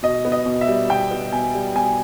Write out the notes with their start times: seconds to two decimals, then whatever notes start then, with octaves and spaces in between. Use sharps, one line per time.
0.03 B2 D#5
0.25 B3
0.32 D#5
0.46 B2
0.61 E5
0.68 G3
0.90 B2 G5
1.11 B3
1.32 B2 G#5
1.54 G3
1.75 B2 G#5